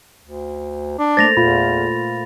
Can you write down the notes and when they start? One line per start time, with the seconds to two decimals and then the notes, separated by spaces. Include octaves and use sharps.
0.23 D2
0.98 D4
1.17 A3 A#3 C5 A6 A#6 F7
1.37 E2 A#2 F4 F5 B5